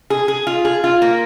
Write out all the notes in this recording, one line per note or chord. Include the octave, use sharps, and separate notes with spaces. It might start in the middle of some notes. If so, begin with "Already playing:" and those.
G#4
G#4
F4
G#4
F4
A#3